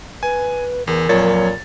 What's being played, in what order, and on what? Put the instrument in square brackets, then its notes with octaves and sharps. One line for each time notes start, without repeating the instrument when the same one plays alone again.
[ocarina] B4 [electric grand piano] G#5
[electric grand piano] E2 [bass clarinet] E3 [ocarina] A#4
[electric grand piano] F2 C#5 A6 [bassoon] A#2 [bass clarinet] F#3